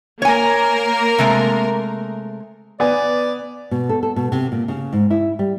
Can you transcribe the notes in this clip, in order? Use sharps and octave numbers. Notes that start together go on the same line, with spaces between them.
A#3 A#4 C#5 G#5
C3 G#3 A3
B3 D5 G#5
B2
A4
A4
B2
C3
A#2
C#3
G#2
E4
G3